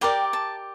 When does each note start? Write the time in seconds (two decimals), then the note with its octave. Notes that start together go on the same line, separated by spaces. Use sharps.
0.01 G4 A#4 D5 G5
0.33 A5